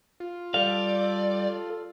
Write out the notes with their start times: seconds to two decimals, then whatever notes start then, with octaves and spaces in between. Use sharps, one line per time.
0.20 F4
0.54 G3 A4 D5 F5